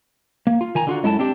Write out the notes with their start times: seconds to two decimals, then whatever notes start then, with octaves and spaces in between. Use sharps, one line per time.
0.47 A#3
0.61 F4
0.75 D#3 G#5 A#5
0.87 D3 F4 F#4
1.03 F#2 G#3 E4 A4 A5
1.19 C4 D4 G4